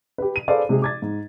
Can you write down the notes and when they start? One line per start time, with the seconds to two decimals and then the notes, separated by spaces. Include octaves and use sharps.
0.18 G4 B4
0.36 D#7
0.48 G#4 A4 B4 C5 D5 F5
0.69 C3 G#3 F#4 G#4
0.82 D6 G#6 A6
1.02 G#2